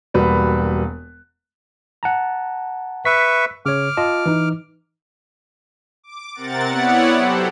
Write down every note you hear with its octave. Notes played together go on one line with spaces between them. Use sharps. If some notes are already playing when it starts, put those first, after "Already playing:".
E1 G3 A#3 F#4 B4 B5
F#5 A5 A#5
B4 E5 C#6 B6
C#3 C#5 D6 F6
F4 D#5 A5
E3 D#4
D6
C3 C4 A#4 F#5 A6
B3 E4 C#5 D5 F#5
F#3 G4 A4 C5